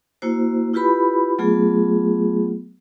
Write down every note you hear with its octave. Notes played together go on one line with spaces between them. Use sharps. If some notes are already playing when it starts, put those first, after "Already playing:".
A#3 E4 F#4 C5
E4 F4 G4 B4 B5
F#3 A3 B3 F4 G#4